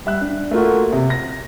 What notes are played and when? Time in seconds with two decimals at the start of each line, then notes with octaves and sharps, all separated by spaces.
0.06 G3 E5 F#6
0.21 D4
0.51 A3 A#3 F4 F#4
0.93 C3
1.10 A#6